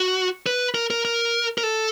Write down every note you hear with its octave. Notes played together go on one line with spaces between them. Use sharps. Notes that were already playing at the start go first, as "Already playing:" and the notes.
Already playing: F#4
B4
A#4
A#4
A#4
A#4
A4